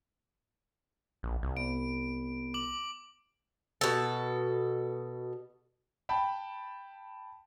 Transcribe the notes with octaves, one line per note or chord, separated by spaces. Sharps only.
A#1
C2
B3 D7
D6 F#7
B2 A4
G5 A5 B5